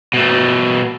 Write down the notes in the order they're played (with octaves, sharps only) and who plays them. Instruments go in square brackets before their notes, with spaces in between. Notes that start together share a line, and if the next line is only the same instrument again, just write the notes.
[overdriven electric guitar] B2 A3